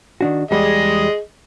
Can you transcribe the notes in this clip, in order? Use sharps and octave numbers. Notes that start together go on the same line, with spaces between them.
D#3 D4 F#4
E2 G3 G#3 G#4 D#5